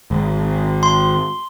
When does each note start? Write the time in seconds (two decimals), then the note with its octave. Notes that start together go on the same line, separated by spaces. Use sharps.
0.11 G#1
0.83 C6